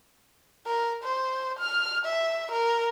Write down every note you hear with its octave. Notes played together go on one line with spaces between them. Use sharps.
A#4
C5
F6
E5
A#4